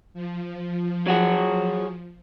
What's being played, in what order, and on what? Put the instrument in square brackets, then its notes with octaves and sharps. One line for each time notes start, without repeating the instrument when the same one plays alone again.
[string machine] F3
[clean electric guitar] F#3 F#4 G#4